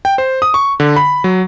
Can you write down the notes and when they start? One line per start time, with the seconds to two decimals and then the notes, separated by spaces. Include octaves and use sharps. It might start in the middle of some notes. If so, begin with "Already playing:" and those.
0.05 G5
0.18 C5
0.42 D#6
0.54 C#6
0.80 D3
0.96 B5
1.24 F#3